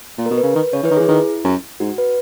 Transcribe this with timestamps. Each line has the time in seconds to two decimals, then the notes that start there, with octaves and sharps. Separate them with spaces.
0.18 A#2
0.26 B2 A#4
0.38 B4
0.43 C#3
0.55 D#3
0.73 C#3 C#5
0.83 E3 B4
0.91 D#3
0.97 G#4
1.00 E3
1.08 D#3 E4
1.44 F#2
1.80 G#2 F#4
1.98 B4